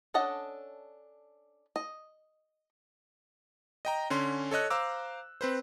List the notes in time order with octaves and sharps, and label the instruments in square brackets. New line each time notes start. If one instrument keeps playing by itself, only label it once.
[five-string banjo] C#4 D4 A4 D#5 F#5
D#5
[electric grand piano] D#5 G5 A#5
D3 C#4 C6
A4 C#5 D#5 F#6
C5 F5 A#5 D6 E6
C4 B4 C5